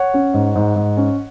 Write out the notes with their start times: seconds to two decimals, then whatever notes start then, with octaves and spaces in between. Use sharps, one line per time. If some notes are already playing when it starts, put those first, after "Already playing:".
Already playing: C#5 F#5
0.14 C#4
0.34 G#2
0.55 G#2
0.76 G#2
0.97 C#4